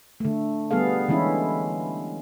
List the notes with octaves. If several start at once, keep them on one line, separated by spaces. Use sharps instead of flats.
D3 A3
G3 B3 G#4 A4 F5
D3 E3 G#3 C#4 E4